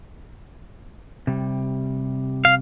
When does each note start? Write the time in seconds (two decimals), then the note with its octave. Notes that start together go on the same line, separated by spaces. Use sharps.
1.27 C3 G3
2.45 F5